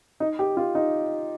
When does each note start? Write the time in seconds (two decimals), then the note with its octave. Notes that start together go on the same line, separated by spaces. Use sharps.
0.20 D#4
0.39 G4
0.57 F4
0.75 D#4